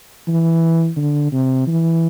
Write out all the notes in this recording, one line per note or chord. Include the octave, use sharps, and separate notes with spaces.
E3
D3
C3
E3